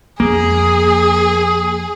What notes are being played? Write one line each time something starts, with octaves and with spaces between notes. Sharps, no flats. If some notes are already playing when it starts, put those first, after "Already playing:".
F2 A#3 G#4